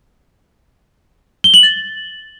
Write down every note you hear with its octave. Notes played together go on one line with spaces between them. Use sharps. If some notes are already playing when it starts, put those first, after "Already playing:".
G7
F#7
A6